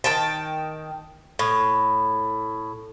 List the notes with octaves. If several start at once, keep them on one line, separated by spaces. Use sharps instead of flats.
D#3 G5 A5
A2